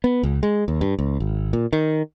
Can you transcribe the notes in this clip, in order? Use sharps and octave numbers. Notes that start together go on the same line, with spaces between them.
B3
C#2
G#3
D#2
G2
C#2
G#1
A#2
D#3